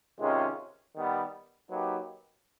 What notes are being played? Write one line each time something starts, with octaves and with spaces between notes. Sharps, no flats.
C3 D#3 G#3 C#4 F4
D#3 G3 B3
F#3 A#3 D#4 G4 B4